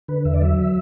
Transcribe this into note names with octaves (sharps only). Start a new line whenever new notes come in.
D3 B4
E2 E5
D5
F#3 E5